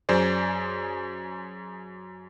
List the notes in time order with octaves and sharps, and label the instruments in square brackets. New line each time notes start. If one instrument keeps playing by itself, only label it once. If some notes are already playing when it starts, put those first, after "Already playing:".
[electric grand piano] F#2 G#4 C5 D5